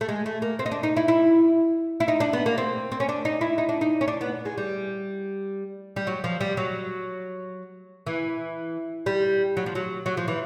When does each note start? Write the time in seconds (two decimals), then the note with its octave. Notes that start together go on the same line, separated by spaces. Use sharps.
0.01 A3
0.09 G#3
0.26 A3
0.42 A#3
0.59 C4
0.66 D#4
0.71 D4
0.83 D#4
0.97 E4
1.08 E4
2.00 E4
2.08 D#4
2.20 D4
2.33 B3
2.46 A#3
2.58 C4
2.92 C4
3.00 C#4
3.09 D4
3.25 D#4
3.41 E4
3.58 D#4
3.69 D4
3.81 D#4
4.01 C#4
4.08 D4
4.21 B3
4.45 G#3
4.58 G3
5.96 G3
6.07 F#3
6.24 F3
6.41 G3
6.57 F#3
8.07 E3
9.06 G3
9.57 F#3
9.66 F3
9.75 F#3
10.06 F#3
10.17 F3
10.28 E3